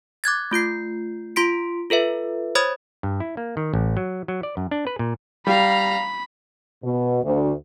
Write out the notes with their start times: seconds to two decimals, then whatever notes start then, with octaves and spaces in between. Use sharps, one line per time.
0.24 D6 F#6 G#6 A6
0.51 A3 F4 G6 C7
1.36 F4 C6 B6 D7
1.90 F4 A4 B4 E5
2.55 C5 C#5 B5 D#6 G#6 A6
3.03 G2
3.20 E4
3.37 A#3
3.57 D#3
3.74 A1
3.97 F#3
4.28 F#3
4.43 D5
4.57 F#2
4.71 D4
4.87 B4
4.99 A#2
5.47 G3 F5 A#5 B5
6.84 B2
7.23 D2